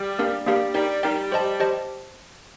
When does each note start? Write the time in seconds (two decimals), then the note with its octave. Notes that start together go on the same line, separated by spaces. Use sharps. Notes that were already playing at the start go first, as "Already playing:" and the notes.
Already playing: G3
0.19 A#3 D4 G4 A#4 F5
0.46 G3 A#3 D4 G4 A#4 F5
0.74 G3 D#4 A#4 D5 G5
1.03 G3 D#4 A#4 D5 G5
1.32 G4 C5 D#5 A5
1.60 G4 C5 D#5 A5